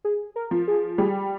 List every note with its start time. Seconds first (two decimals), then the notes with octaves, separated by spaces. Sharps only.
0.04 G#4
0.36 A#4
0.51 F3
0.68 G#4
0.98 G3 G#4